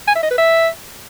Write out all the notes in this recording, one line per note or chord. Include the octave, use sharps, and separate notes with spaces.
G#5
E5
D#5
B4
E5